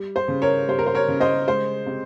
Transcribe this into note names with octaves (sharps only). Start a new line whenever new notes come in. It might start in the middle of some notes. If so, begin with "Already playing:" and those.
Already playing: G3
C5
C#3
A#4 C#5
G3 C5
A#4
C5
A#4 C#5
C#3
C5 D#5
G#3 C5
C3